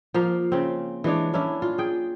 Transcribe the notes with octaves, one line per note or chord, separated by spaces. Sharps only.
F3 A#3 F5
C#3 C4
E3 G#3 D4 C#5
A#3 C#4 D4 E4
F4
G#4 G5